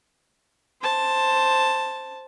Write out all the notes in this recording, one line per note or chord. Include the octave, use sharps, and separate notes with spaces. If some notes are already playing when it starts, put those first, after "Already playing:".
C5 A5